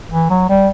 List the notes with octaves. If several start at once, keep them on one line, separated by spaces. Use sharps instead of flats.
E3
F#3
G3